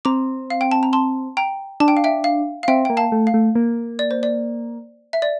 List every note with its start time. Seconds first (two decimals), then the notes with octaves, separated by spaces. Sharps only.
0.05 C4 A#5 D6
0.50 F5
0.61 G5
0.71 A5
0.83 A#5
0.93 A5 C6
1.37 G5 A#5
1.80 D4 A5
1.88 G5
1.97 F5
2.04 E5 G5
2.24 F5
2.63 F5
2.68 C4 E5 G5
2.85 A#3 G5
2.97 F5 A5
3.12 A3
3.27 F5
3.34 A3
3.55 A#3
3.99 D5
4.11 C5
4.23 D5
5.13 E5
5.22 D5